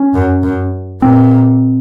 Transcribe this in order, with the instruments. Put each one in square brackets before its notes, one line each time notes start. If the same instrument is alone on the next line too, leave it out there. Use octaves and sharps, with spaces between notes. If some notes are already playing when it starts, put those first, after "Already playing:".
Already playing: [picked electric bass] C#4
[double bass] F#2
F#2
[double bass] A#2 [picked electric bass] C4